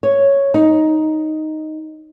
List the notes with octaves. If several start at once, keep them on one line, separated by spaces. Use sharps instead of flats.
C#5
D#4